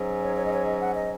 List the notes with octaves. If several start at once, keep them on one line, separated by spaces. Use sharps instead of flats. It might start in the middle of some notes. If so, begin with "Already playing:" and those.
Already playing: G#2 F#3 C#4
C#5
C#5
D#5
C#5
D#5
F#5
D#5